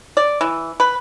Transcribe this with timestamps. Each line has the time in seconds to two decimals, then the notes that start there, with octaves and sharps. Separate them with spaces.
0.17 D5
0.41 E3
0.80 B4